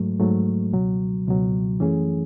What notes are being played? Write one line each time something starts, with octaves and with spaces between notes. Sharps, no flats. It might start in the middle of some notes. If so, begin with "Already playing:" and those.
Already playing: G#2 F#3 A3
G#2 F#3 A3
C#2 B2 F#3
C#2 B2 F#3
F#2 E3 A3 C#4 G#4